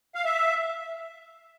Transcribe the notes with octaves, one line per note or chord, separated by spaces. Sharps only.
F5
E5